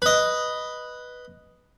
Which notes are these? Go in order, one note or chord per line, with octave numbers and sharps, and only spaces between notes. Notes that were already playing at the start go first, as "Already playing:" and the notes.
B4 D#5